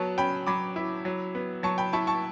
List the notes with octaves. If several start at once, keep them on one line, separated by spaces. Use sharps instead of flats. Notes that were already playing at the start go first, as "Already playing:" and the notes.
Already playing: F#3 B3 A5 C#6
C#4 G5 B5
F#3 B5 D6
E4
F#3
B3
F#3 A5 C#6
G5 B5
E4 A5 C#6
A5 C#6